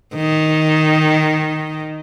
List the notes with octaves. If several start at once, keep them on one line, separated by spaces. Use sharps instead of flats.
D#3